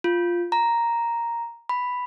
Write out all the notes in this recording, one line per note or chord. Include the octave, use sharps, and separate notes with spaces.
F4
A#5
B5